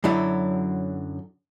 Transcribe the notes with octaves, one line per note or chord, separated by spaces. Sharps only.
F#2 D3 F#3 E4